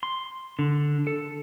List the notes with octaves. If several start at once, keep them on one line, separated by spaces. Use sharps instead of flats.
C6
D3
A4